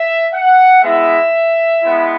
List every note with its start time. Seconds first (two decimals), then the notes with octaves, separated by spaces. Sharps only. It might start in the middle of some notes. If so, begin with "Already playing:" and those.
Already playing: E5
0.33 F#5
0.82 G#3 B3 E4 E5
1.83 G#3 B3 E4